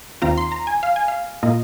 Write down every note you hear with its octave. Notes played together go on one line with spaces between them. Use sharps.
D#2 D#3 C4 F4 A#5
C6
A#5
G#5
F5
G#5
F5
A#2 A#3 F4 D#5